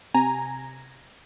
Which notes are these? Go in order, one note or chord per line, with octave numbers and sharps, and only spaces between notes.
C3 G#5 A#5